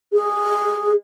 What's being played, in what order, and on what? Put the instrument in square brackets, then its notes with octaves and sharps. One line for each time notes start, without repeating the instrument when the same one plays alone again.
[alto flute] G#4